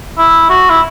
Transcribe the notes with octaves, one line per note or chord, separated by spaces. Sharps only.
E4
F#4
E4